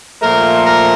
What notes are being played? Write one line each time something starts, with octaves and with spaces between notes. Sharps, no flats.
A#2 F3 A3 A#4
A#4